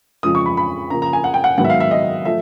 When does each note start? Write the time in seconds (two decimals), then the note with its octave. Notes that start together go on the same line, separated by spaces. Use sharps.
0.23 F2 C#3 F3 G#3 D#6
0.35 C#6
0.46 B5
0.57 B5
0.90 C#3 F3 A#3 A#5
1.02 A#5
1.13 G#5
1.24 F#5
1.34 G5
1.44 F#5
1.58 G#2 D#3 F#3 B3 F#5
1.64 E5
1.70 F5
1.80 E5
1.91 D#5
2.25 F3 A3 E5